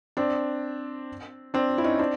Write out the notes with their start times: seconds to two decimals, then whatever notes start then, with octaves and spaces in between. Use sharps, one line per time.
0.17 C4 D4
1.54 C4 D4
1.78 E4
1.84 C#4 D#4
1.99 C4 D4